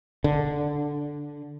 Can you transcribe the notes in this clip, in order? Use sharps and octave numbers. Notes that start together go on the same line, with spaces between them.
D3